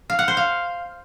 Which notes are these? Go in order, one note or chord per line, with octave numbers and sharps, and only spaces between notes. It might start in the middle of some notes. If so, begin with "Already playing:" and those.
F5
F#5
C5
F5